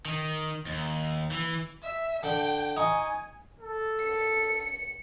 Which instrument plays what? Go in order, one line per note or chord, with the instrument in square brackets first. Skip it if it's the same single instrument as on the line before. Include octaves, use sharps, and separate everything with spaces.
[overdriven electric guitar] D#3
D#2
E3
[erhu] E5
[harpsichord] D3 [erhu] G5
[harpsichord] D#4 C#6 [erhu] G#5
[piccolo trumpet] A4
[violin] C#7